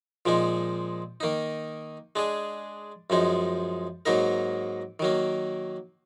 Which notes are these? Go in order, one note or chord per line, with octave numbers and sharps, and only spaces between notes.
A#2 F3 G#3 D#4
D#3 A#3 D#4
G#3 D4 G#4
F#2 F3 G#3 D#4
G#2 F#3 A#3 D#4 A#4
D#3 F#3 A#3